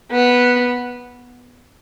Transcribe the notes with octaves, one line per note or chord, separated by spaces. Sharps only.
B3